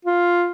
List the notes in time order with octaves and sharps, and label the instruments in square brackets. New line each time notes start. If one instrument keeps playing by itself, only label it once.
[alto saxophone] F4